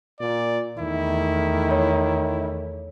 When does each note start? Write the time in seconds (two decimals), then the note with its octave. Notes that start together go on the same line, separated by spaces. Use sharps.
0.20 A#2 D5
0.79 E2 D#3 A3 E4
1.71 C#5